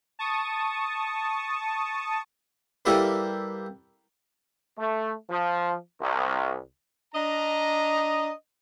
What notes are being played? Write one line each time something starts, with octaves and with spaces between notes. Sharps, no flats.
A5 C#6 D#6
G3 A#3 E4 G4 A4 B4
A3
F3
C2
D4 D#5 A#5